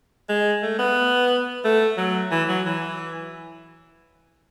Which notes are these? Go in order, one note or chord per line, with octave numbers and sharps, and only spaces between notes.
G#3
A3
B3
A3
F#3
E3
F#3
E3